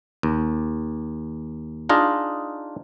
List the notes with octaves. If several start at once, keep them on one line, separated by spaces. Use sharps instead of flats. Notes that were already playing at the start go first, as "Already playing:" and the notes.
D#2
D4 D#4 F4 G#4 D#5